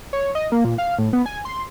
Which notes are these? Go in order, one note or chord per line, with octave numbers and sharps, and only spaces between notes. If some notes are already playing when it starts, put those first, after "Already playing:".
C#5
D#5
A#3
A#2
F5
A2
B3
G#5
C6